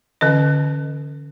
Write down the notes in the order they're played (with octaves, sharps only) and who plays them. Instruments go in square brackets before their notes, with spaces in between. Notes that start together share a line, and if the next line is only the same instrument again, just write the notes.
[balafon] D3 E3 C#4 D#5